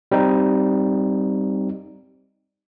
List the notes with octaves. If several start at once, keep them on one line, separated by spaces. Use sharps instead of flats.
G3 C4 D#4